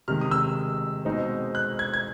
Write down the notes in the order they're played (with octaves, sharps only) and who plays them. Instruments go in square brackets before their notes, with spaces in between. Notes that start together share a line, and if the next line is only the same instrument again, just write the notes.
[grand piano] C3 D#3 G#3 F6
D#6
E6
B2 G#3 C4 D#4
F#6
G#6
G#6